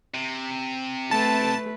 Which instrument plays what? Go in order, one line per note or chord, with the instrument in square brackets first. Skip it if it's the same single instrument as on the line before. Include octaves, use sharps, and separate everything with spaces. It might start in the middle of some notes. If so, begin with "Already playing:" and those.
[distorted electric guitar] C3
[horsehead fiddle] A3 B4 [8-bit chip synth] A5